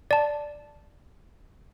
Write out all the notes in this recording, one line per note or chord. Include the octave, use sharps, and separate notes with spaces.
D5 A5